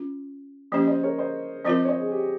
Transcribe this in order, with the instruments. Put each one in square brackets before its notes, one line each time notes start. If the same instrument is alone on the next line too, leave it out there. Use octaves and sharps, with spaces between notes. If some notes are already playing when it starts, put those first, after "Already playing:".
Already playing: [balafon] C#4 F4
[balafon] F3 A#3 C#4 G4 [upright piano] C5 D#5
[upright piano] C5 D#5
A#4 C#5
C5 D#5
[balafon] F3 C4 F4 A#4 [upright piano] C5 D#5
[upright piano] C#5
C5 D#5
G#4
G4